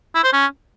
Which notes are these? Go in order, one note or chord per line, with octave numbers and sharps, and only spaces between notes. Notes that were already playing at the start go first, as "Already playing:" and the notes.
E4
C5
C#4